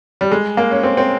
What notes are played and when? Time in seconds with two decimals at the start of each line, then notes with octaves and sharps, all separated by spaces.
0.21 G3
0.32 G#3
0.57 A#3
0.71 C#4
0.83 C4
0.97 C4